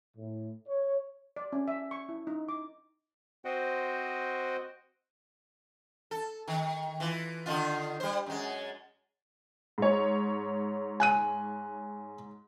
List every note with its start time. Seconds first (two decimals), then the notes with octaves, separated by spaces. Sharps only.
0.17 A2
0.67 C#5
1.36 D5
1.52 C#4
1.68 E5
1.91 C#6
2.09 E4
2.27 D#4
2.49 D6
3.45 C4 F#4 C5 D#5 F#5 G5
6.11 A4
6.48 D#3
7.00 E3 F4
7.46 D3 D#3 F4
8.00 G3 C5
8.26 F#2 G#3
9.78 G#2 C#5
11.00 G#5 F#6 D#7